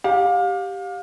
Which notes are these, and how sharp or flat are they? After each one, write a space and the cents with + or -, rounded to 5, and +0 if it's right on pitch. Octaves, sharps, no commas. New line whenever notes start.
G4 +0 F5 +30